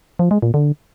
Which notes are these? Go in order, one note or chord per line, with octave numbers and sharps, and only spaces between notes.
F3
G#3
A#2
D3